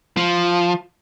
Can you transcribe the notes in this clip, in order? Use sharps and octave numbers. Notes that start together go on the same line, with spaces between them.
F3